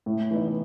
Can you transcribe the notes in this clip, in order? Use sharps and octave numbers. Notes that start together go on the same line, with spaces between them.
A2
E3 B3 D#4